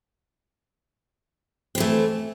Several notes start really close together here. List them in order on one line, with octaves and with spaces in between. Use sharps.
C4 E3 A3